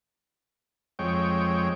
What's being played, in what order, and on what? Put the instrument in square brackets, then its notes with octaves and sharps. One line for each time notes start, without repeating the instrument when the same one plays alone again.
[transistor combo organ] F2 G#3 C#5 G5